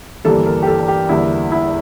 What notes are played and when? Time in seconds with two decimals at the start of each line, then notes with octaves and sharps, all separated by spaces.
0.25 G1 G2 E3 G3 A#3 A4
0.46 A#4
0.63 G4
0.67 A4
0.88 G4
1.09 E2 D3 G3 A#3 E4
1.52 E4